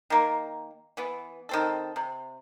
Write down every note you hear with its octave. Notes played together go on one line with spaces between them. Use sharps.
D#3 A#3
E3 B3
D#3 C4 A4
C3